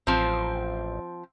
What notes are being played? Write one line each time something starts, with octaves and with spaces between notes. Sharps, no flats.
A1 F3 C4